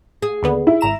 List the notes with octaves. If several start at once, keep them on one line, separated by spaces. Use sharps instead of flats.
G#4
D#2 D3 B3
E4
G#1 A#5 E7